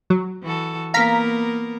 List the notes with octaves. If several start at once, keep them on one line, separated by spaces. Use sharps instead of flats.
F#3
E3 F#4 A4
A#3 B3 A#4 F5 A#5 B6